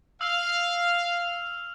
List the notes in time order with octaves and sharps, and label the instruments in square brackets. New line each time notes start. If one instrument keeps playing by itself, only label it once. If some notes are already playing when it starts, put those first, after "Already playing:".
[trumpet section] F5 [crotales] E6 F6 F7